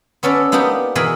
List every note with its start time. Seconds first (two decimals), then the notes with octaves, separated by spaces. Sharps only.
0.23 B3 C#4 A4 B4 D5
0.52 A#3 B3 D4 D#4 G4
0.95 B2 E3 G#4 A#4 G#5 B5